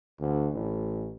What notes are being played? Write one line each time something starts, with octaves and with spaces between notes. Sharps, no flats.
D2
A1